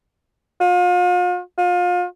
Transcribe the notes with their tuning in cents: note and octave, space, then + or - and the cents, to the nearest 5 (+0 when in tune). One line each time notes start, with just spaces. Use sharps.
F4 +40
F4 +30